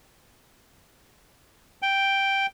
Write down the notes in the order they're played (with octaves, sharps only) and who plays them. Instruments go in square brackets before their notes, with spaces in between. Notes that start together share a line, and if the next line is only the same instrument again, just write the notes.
[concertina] G5